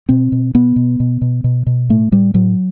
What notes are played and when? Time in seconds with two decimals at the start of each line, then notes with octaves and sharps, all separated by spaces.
0.09 B2 C4
0.32 B2
0.55 B2 B3
0.76 B2
1.00 B2
1.21 B2
1.44 B2
1.67 B2
1.89 A2 A3
2.12 A2 G3
2.34 A2 F#3